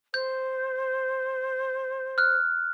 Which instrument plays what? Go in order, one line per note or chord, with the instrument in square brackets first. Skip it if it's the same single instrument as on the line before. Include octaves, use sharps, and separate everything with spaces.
[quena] C5 [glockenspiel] G6
[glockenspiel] F6 F#6